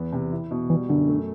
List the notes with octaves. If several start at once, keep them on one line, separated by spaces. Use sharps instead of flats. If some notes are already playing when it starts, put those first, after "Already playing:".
Already playing: E2 B3
C3
E4
B2
E3 G3
F#2 D3
A3